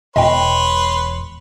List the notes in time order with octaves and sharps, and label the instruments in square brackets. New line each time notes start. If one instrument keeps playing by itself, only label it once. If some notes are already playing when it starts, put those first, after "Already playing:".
[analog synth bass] E1 [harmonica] B4 C#5 C6 [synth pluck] D#5 G5